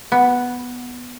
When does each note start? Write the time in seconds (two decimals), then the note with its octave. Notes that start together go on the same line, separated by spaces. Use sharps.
0.12 B3